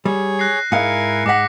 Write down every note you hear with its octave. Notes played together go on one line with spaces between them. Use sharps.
G3 G#4 C#5
F#6 A#6 C7
G#2 E4 A#4 F5 G#5 C#7
G#2 F#5 D6 A#6 B6